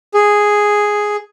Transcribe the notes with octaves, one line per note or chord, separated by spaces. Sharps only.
G#4